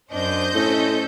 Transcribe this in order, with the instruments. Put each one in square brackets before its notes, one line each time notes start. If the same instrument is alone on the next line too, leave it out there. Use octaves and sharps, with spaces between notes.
[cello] F#2 D4 [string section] C5 D#5 G6
[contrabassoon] A2 [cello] C#4 A4